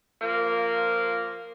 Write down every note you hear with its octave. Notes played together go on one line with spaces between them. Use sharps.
F3 A#3